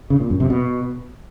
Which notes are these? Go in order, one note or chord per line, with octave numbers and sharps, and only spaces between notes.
C#3
A#2
F#2
C3
B2